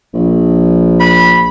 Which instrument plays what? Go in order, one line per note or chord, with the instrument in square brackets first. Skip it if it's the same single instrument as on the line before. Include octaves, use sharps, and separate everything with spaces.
[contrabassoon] A#1
[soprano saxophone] B5